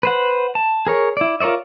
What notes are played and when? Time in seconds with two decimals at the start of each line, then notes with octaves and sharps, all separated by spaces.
0.03 B4 C5 F#5
0.55 A5
0.87 G#4 A#4 C#5
1.17 E4 D5
1.40 F4 A#4 C#5 D5 E5